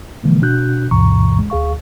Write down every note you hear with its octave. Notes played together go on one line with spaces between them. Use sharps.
B2 D3 E3 F3 G#3 A#3
B2 D4 F#4 F#6 G6
D2 G2 B2 E3 A#5 C#6
G#3
D2 G#4 F5 C#6